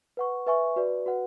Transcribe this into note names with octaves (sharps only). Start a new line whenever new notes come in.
B4 F#5 C#6
B4 E5 G#5 C#6
F#4 B4 D5
F#4 B4 F#5